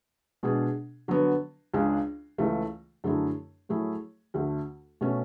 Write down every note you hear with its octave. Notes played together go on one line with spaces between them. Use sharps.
B2 G#3 D4 G#4
D3 F#3 B3
C#2 C#3 G#3 D4 G#4
C#2 C#3 E3 A3
F#2 D3 A3 E4 G#4
A2 F#3 A3 E4 G#4
D2 D3 A3
B2 A3 C#4